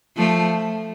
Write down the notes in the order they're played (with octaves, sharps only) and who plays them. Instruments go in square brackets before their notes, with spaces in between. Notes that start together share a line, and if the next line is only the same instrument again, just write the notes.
[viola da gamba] F3 A3